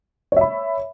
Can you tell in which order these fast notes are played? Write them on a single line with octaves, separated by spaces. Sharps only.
C#5 E5 B5